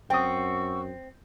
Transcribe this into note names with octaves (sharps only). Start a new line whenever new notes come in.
F#2 C4 F#5 G5 C#6 D#6 E6